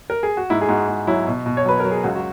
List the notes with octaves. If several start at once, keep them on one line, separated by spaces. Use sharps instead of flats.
A#4
G#4
F#4
G#2 E4
G#4
G#2 F#4
G#2
F#3 E4
B2
B2
C#5
F#3 B4
F#3 A#4
G#4
C#2 F#4
F#4